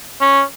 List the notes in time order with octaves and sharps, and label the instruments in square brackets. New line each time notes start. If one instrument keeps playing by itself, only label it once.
[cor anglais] C#4